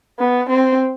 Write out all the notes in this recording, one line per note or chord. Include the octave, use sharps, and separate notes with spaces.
B3
C4